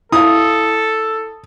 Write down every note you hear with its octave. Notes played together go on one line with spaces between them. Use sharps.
E4 A4 F5 D#6